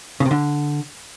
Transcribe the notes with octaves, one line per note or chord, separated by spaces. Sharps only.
C#3
C3
D3